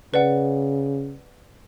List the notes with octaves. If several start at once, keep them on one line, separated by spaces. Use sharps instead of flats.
C#3 B4 D5 F#5